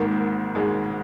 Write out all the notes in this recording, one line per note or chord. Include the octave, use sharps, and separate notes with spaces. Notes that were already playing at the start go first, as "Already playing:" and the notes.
Already playing: G#1 G#2 D#3 A#3
G#1 G#2 D#3 G#3